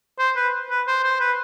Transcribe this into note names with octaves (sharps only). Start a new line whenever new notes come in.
C5
B4
B4
C5
C5
B4